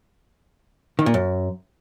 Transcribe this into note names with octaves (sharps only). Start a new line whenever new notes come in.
D#3
A#2
F#2